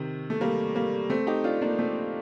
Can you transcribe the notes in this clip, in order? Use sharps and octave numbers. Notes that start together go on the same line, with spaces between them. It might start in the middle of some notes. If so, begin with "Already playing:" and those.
Already playing: C3 D#3
A3
G3 A#3
G3 A#3
A3 C4
D#4 G4
D4 F4
A#3 D4
A3 C4